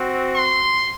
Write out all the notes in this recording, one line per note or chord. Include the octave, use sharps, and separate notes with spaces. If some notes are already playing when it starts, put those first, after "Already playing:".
Already playing: C4 F#4
C6